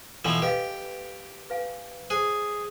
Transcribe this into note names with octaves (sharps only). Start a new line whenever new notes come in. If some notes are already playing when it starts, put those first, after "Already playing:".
B2 E3 F3 A4 G#5 E6
G4 B4 D#5 F5
B4 F5 G#5
G#4 C5